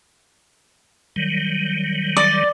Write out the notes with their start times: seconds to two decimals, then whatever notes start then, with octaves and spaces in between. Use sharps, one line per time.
1.16 D#3 F#3 G3
2.17 D5